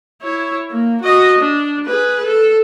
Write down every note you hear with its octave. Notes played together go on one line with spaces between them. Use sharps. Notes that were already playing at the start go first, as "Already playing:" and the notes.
E4 C#5
A#3
F#4 D#5
D4
G#4 B4
A4